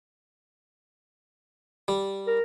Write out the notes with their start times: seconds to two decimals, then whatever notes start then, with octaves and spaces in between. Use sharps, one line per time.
1.88 G3
2.27 A#4